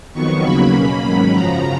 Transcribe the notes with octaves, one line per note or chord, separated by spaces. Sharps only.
F2 D#3 F#3 B3 C#6
D#2 C#3 F#3 A#3 B5
B2 A#3 C#4
G#2 D#3 F#3 C#4
F#2 C#3 F3 A#5